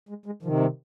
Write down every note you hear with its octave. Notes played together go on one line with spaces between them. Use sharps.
G#3
G#3
C3 D#3 F3
G3